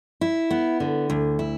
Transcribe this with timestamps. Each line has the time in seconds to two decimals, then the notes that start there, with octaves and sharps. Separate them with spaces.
0.21 E4
0.51 B3
0.80 D3
1.10 D2
1.39 E4